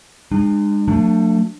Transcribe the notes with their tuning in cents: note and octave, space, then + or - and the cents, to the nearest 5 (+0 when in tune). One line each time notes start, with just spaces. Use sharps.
G#3 -30 D4 +45
F#3 -30 A3 +30 D4 +0